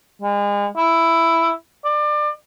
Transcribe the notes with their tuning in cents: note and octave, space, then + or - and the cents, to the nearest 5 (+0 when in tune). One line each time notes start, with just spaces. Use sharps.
G#3 -35
E4 +5
D5 +25